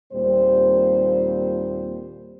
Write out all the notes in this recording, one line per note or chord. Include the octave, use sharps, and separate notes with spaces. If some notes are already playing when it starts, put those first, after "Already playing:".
D#2 A#2 G3 C4 C5